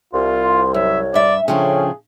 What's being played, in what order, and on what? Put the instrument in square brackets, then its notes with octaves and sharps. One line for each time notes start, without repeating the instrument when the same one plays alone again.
[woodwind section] C2 [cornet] F4 [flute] C6
[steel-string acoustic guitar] F#2 [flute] C#5 [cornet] E5
[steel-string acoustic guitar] G2 E5 [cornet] D5
[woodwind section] A2 C#4 [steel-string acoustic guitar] C#3 F3 D4 [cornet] G#4 [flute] G5